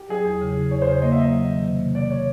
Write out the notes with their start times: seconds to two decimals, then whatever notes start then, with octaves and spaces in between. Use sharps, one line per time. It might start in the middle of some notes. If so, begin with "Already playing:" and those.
Already playing: G4
0.09 F#3 G#4
0.25 E2
0.41 C#3
0.56 E2
0.71 E2 C#5
0.82 C5
0.87 C#3 C#5
1.02 A#3 D#5
1.12 E5
1.18 F#3 D#5
1.33 F#3
1.49 D#3
1.64 C3
1.80 A#3
1.95 A#3 D5
2.10 A#3 C#5